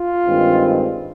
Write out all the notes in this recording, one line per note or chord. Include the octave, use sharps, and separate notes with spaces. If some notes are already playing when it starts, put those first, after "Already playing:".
Already playing: F4
G2 D#3 G#3 C4